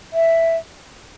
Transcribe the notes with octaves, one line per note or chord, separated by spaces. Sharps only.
E5